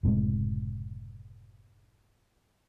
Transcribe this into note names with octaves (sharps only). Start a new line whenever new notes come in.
F#1 A2 C3 G#3